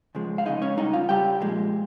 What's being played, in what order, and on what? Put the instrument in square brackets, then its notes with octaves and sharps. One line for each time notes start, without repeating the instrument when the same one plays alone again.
[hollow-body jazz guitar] C#3 F3 G#3
F5
C#3 F3 G#3 D#4 D#5
C#4 C#5
C#3 G3 D#4 D#5
F4 F5
C#3 G3 G4 G5
A#2 F3 G#3